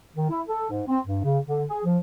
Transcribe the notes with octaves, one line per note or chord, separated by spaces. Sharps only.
D#3
E4
A4
G#2
C4
G2
C#3
D3
G#4
F3